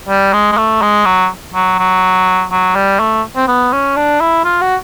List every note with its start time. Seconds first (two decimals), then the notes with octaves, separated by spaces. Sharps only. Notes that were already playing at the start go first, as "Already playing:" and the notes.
0.08 G3
0.33 G#3
0.52 G#3
0.57 A3
0.82 G#3
1.05 F#3
1.54 F#3
1.79 F#3
2.51 F#3
2.75 G3
3.00 A3
3.36 C4
3.48 B3
3.72 C#4
3.96 D4
4.20 E4
4.44 F4
4.61 F#4